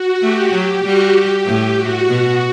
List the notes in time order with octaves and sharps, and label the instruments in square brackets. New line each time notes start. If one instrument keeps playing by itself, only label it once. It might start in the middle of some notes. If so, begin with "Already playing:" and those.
Already playing: [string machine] F#4
[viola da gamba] A3 [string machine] G4
[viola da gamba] F#3
[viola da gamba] G3 [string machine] F#4
[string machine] G4
[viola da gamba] A2
[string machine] F#4
[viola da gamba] B2 [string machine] F#4